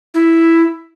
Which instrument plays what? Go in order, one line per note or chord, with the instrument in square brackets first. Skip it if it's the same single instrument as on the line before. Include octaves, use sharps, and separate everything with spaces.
[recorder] E4